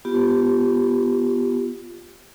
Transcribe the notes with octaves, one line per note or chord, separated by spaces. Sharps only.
B3 F4 G4